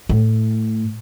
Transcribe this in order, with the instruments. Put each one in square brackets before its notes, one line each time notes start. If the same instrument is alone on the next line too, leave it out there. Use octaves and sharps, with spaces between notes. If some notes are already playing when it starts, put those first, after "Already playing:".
[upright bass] A2